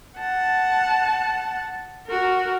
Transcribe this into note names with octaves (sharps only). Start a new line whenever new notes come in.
F#5 A5
F#4 A#4